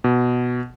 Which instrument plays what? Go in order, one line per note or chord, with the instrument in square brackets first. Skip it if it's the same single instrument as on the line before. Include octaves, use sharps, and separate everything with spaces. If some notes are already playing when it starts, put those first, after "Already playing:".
[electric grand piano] B2